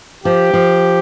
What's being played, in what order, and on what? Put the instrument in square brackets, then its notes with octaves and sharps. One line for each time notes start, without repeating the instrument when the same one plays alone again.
[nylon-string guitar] F3 [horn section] G4
[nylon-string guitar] F3